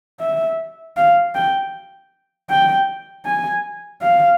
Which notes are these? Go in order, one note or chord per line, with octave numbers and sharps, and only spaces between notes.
E5
F5
G5
G5
G#5
F5